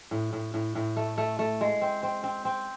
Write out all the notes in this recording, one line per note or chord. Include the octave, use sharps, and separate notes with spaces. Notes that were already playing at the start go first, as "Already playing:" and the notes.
A2
A2
A2
A2
A3
A3
A3
G#3
C4
C4
C4
C4